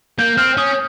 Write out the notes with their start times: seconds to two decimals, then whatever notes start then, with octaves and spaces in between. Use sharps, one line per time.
0.19 A#3 G6
0.37 C4 F6
0.57 C#4 D#6